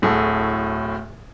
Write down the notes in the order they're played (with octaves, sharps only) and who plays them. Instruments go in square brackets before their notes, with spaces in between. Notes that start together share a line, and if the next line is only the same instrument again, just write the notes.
[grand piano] D1 A2 F#4 G#4 A4